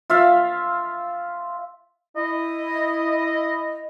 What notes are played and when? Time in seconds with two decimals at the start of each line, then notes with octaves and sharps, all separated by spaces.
0.10 F4 E5 F5
2.16 E4 D#5